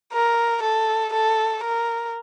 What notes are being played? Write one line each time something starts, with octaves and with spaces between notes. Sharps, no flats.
A#4
A4
A4
A#4